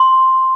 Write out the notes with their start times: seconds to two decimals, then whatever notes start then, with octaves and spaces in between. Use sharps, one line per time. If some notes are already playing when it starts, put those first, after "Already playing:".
Already playing: C6